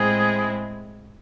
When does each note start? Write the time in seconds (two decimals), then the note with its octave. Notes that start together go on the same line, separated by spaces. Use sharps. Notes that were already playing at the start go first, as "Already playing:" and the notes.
Already playing: A2 G#3 C4 E4 G#4